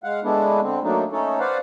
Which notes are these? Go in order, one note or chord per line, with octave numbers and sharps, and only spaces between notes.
G#3 F5 F#5
G#3 A3 B3 D4 E4
D3 C4
F#3 A3 A#3 D4 D#4
A3 C#4 D#4 A4 C#5
B4 C5 D5 F5 F#5